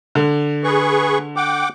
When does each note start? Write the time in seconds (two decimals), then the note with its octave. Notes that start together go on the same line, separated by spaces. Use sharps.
0.15 D3
0.64 G#4 B4 C#6
1.36 F#5 G5 D6